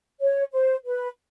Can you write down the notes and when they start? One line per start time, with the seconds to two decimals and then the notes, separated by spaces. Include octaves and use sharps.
0.21 C#5
0.53 C5
0.85 B4